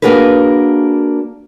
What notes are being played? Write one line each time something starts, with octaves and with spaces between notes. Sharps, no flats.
A#3 D4 F#4 G#4 A#4 B4